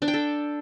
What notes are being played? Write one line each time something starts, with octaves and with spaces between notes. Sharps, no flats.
D4
G5
A4